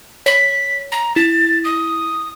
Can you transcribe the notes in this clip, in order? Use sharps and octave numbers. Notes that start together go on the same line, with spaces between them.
C#5 B6
A#5
E4 A6
D#6